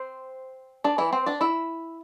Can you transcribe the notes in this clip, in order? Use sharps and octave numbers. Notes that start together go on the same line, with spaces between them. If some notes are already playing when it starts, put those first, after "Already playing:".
Already playing: C4 C5
D4 D5
E3 E4
C4 C5
D4 D5
E4 E5